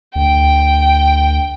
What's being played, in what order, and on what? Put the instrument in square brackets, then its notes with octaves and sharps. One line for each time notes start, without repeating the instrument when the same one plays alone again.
[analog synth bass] D2 [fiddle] G5